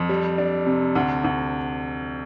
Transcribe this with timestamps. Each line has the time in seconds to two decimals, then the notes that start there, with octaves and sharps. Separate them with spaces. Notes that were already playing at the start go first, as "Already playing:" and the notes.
Already playing: F2
0.09 G3
0.38 D4
0.66 C3
0.95 D2
1.24 D2